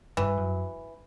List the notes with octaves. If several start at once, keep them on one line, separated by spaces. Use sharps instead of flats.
G2 E3
F#2